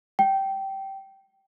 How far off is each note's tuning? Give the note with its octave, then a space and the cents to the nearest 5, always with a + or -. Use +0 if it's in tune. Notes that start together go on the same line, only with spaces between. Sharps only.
G5 -15